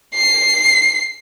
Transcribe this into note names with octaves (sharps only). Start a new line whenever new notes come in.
C7